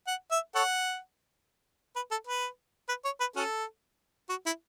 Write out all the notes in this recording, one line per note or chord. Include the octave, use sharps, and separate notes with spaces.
F#5
E5
A4 C#5 F#5
B4
A4
B4
B4
C#5
B4
C#4 F#4 A4
F#4
E4